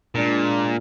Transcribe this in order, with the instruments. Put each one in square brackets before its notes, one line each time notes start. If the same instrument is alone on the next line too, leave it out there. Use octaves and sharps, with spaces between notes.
[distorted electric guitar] A#2 [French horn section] G#3 D4